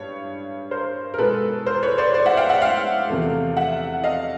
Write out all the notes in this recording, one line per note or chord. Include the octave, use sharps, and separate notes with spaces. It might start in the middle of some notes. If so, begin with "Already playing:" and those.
Already playing: G2 C#5
A#4 C5
A#4
B2 G#3 B3 A4 B4
A#4 C5
B4 C#5
C5 D5
C5 D5
E5 F#5
F5 G5
E5 F#5
F5 G5
E2 C3 F3 A3
E5 F#5
D#5 F5